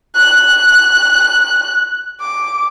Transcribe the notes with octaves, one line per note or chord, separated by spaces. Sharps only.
F#6
D6